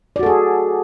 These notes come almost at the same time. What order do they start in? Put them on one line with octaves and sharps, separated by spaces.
D5 F#4 A4 G#4